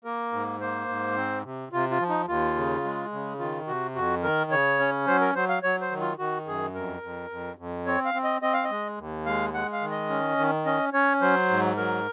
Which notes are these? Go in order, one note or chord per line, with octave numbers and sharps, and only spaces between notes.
A#3 A#4
G#2
A#3 C5
G#2
C4
C3
C3 F4
F4
F3
D#4
D#2 F4
C#3
G#3
C#3
D#3 F4
C3 F#4
F2 F#4
D#3 A#4
C#3 C#5
C#4
F#3 C5
A#4
F#3 C5
F5
F#3 C#5
C5
D#3
F4
D#3 F#4
F#2 G#4
F2 A#4
F2
F2
F2
C4 C#5
F5
C4
D#5
C4 D#5
F5
D#5
G#3
D#2
G#3 F5
G#3 F#5
F5
D#3
D#5
C#4
D#3
C#4 D#5
C#4 C#5
F#3 C5
G#2
F#3 A#4